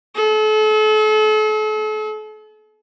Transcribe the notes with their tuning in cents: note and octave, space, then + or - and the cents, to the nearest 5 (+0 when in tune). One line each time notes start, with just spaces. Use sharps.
A4 -40